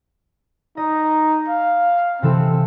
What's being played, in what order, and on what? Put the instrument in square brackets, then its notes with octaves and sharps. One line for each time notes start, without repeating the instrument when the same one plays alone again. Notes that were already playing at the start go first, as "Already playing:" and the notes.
[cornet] D#4 [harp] D#5
[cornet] F5
[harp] C3 E3 A4 [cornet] C4